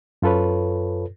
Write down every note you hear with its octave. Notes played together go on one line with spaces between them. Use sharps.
F#2 F4 A4 B4 C#5